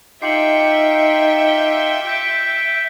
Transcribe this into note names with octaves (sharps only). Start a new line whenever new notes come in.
D#4 F4 G4 E5 G5 C7 C#7 F#7
G7
G6 B6 D7